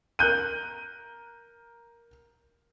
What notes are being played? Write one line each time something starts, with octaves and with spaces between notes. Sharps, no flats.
A#4 F#6 G6 D#7